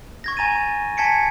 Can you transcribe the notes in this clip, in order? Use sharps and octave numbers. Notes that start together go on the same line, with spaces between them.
C#6 G#6 A#6
G#5 A#5 A6 D#7
G#5 A5 G#6 B6 C#7 D7